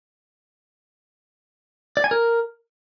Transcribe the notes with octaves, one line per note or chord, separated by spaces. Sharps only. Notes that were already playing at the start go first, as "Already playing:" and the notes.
D5
G#5
A#4